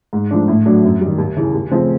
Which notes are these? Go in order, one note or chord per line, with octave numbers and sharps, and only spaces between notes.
G#2
F3 A3 D4
A2
F#3 A3 D4
F#2
D#3 G3
D#2
C#3 E3
D#2
C#3 F3 A3 C4